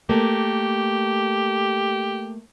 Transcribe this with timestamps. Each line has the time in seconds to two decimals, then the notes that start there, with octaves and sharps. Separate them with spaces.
0.09 A3 A#3 G4